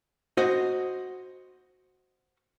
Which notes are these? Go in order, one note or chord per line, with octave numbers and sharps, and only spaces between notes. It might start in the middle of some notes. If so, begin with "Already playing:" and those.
F#4 C5 D#5